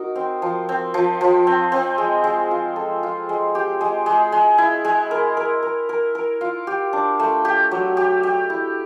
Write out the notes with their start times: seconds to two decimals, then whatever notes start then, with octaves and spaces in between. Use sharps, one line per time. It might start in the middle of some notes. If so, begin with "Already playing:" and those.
Already playing: D#4 F#4 A#4
0.16 C4
0.42 F3
0.69 C4
0.94 F3
1.21 F3
1.47 C4
1.72 C4
1.98 G#3
2.24 G#3
2.51 F4
2.76 A4
3.03 F4
3.29 G#3
3.55 G4
3.81 G#3
4.06 G#3
4.32 G#3
4.58 E4
4.85 G#3
5.11 A#4
5.37 A#4
5.63 A#4
5.89 A#4
6.15 A#4
6.41 F4
6.67 G4
6.93 D4
7.20 A3
7.45 G4
7.71 F#3
7.97 G4
8.23 G4
8.50 E4